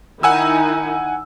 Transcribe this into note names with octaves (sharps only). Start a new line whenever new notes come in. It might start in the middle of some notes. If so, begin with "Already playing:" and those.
D#3 D#4 E4 F#5 G#5 E6